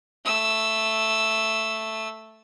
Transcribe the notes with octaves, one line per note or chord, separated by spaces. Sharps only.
A3 E6